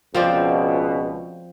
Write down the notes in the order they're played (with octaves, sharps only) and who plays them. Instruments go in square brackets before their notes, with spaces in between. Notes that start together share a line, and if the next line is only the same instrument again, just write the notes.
[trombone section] C#2 B2 [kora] F3 C4 D5